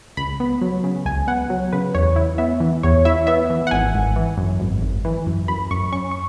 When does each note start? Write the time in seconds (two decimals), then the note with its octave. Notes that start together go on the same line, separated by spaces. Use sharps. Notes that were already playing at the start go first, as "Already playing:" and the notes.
0.17 C#2 B5
0.40 B3
0.61 F#3
0.84 C#3
1.06 C#2 G#5
1.27 B3 F#5
1.50 F#3
1.73 C#3 B4
1.95 E2 C#5
2.16 E4
2.38 B3 E5
2.60 E3
2.83 E2 C#5
3.05 E4 E5
3.27 B3 E5
3.50 E3
3.67 F#5
3.71 G#1 G#5
3.94 G#1
4.16 E3
4.38 F#2
4.60 G#1
4.82 G#1
5.05 E3
5.26 F#2
5.48 F#2 B5
5.71 F#2 C#6
5.92 C#4 C#6
6.11 C#6